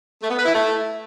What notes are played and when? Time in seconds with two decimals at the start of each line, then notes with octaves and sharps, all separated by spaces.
0.21 A3
0.29 B3
0.37 B4
0.45 E4
0.53 A3